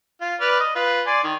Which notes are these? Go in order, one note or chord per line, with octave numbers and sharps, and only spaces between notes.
F4
B4 D5 F6
D#5
F4 B4
D5 G#5 C6
D#3